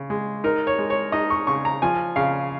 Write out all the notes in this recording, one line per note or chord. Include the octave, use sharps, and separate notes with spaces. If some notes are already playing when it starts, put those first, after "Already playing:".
Already playing: C#3
G#3
D#4 A#4
C#5
G#3
C#5
D#4 D#5
C#6
C#3 C#6
A#5
F3 G#5
C#3 F5